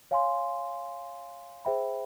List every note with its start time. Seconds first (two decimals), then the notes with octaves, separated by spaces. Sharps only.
0.11 C#5 F5 G#5 C6
1.65 G#4 C5 E5 G5 B5